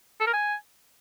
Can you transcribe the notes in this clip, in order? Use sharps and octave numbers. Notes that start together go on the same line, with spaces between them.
A4
A#4
G#5